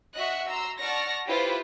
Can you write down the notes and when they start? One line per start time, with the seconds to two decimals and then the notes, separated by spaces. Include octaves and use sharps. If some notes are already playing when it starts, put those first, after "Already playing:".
0.14 F#4 D#5 E5 F#6
0.49 A#5 C6 E6
0.81 D5 F#5 A5 C#6 F6 A#6
1.26 E4 F4 G4 B4 C5